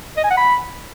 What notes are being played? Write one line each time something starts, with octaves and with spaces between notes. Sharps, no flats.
D#5
G#5
F#5
B5